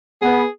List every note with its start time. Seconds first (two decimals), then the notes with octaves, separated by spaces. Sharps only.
0.22 B3 G#4